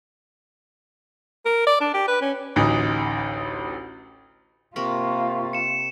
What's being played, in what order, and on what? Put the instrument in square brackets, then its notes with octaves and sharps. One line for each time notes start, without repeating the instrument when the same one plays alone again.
[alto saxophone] A#4
D5
D4
G4
B4
C#4
[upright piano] A1 D2 D#4
[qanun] C3 A#4 B5 [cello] A#3 F4 [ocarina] C#6
[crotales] C#7 E7